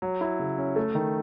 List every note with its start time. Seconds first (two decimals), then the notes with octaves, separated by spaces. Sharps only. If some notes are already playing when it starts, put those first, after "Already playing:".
0.02 F#3
0.21 E4
0.39 C#3
0.58 C#4
0.76 A3
0.95 D#3